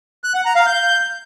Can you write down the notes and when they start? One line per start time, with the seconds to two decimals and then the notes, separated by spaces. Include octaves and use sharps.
0.24 F#6
0.34 F#5
0.45 A#5
0.56 F5
0.66 G6